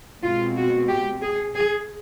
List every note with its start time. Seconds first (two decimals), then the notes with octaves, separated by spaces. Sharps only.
0.23 B2 G#3 C4 F4
0.56 F#4
0.89 G4
1.22 G#4
1.55 G#4